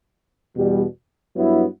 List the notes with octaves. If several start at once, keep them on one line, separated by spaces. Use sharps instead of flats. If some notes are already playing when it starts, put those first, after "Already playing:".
E2 B2 G3
G2 F#3 B3 E4